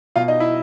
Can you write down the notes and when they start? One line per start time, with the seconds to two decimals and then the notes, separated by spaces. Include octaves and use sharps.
0.16 B2 F4 F5
0.28 D#4 D#5
0.40 E4 E5